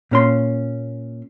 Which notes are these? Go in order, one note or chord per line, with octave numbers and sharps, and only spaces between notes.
A#2 C#4 C6